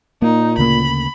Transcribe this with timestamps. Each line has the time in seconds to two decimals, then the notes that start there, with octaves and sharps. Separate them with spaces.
0.22 A#2 A#3 D#4
0.58 D2 C#3 A#3 B5